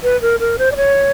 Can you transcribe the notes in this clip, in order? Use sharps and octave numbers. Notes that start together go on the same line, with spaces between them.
B4
A#4
A#4
C5
D5
C#5